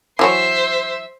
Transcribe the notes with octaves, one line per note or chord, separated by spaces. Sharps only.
E3 F#3 C5 C#5 E5